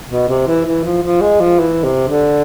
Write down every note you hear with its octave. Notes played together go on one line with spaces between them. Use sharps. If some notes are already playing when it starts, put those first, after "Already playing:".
B2
C3
E3
E3
F3
F3
G#3
F3
E3
C3
D3